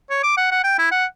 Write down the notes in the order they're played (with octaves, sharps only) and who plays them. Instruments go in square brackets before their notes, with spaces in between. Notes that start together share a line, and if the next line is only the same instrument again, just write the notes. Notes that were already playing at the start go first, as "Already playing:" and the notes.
[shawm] C#5
D6
F#5
F#5
G5
E4
F#5